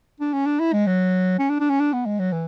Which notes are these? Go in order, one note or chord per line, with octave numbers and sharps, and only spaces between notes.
D4
C#4
D4
E4
G#3
F#3
C#4
D4
D4
C#4
D4
B3
G#3
F#3
E3